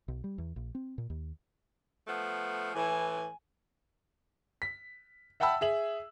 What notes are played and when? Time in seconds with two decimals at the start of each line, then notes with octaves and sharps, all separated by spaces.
0.08 B1
0.24 G3
0.38 E2
0.56 A#1
0.75 C4
0.98 A#2
1.10 D#2
2.07 F3 A3 B3
2.75 A2 E3 G#5
4.62 B6
5.40 E5 F#5 G5 A5 B5 E6
5.61 G#4 E5 F#7